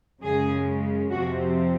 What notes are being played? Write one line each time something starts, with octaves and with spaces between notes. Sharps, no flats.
F#2 C#3 G#3 G#4
F2 C3 F3 C4 F#4